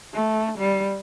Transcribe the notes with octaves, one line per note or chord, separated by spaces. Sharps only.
A3
G3